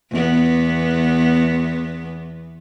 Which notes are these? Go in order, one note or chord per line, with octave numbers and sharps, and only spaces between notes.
E2 B3